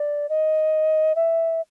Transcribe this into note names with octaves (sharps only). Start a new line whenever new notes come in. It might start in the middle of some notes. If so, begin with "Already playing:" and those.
Already playing: D5
D#5
E5